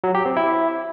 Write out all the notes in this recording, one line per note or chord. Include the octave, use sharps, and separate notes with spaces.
F#3
G4
C4
E4